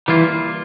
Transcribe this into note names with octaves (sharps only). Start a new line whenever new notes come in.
E3 G3 A#3 F4